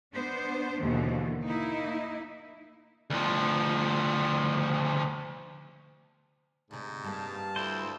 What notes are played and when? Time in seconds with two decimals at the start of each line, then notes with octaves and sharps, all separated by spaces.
0.13 B3 D4 C5
0.81 D#2 B2 D3 E3
1.45 A#3 D#4 E4
3.10 D2 F3
6.71 D2 G#2 C3
7.04 G2 G3 A#3 F5 A5
7.56 D2 E4 C5